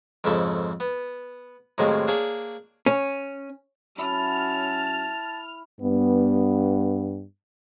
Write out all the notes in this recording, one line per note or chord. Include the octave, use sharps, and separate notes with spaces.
F2 G#2 C#3 E4 A4
B3
A2 C3 D#3 F#3 G#3 A#3
A#3 D4 G#4 C#5
C#4
F#3 C#4 E4 F#4 A5 F6
G2 B3